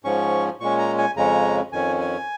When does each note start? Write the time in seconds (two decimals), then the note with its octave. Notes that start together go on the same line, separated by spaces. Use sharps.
0.04 G#2 F3 C#4 C#6
0.60 A#2 G#3 C#4 C#6
0.79 A#5
0.98 G#5
1.16 F2 C#3 G#3 C#4 A#5
1.72 F2 D#3 C#4 G#5
2.00 G#5